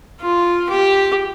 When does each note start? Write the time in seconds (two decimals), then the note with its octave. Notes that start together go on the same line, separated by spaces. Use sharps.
0.20 F4
0.70 G4